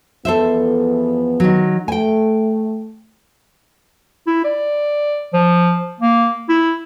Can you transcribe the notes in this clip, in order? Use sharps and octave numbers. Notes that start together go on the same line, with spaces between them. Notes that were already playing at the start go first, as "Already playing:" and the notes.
E2 F3 B3 A4 C5 E5
D#3 F#3
A3 G5 G#5
E4
D5
F3
A#3
E4